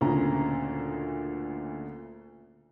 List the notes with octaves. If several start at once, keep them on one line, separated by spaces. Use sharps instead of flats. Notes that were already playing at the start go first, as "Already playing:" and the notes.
D2 A#2 C#3 A#5